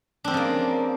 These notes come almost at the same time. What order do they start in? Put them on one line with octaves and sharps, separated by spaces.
D4 C4 F3 C#3 A#3